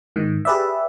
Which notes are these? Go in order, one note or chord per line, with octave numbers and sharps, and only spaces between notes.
G#2 D#3
G4 G#4 B4 D5 E5